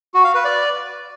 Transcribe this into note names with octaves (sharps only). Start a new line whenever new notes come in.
F#4
F5
B4
D5